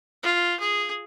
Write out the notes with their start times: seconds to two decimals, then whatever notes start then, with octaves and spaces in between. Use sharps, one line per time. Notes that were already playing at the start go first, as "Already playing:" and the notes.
0.23 F4
0.59 G#4